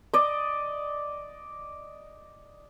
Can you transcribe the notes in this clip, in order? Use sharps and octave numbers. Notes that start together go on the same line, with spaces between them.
D5 D#5